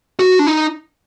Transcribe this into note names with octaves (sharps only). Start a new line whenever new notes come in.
F#4
D4
D#4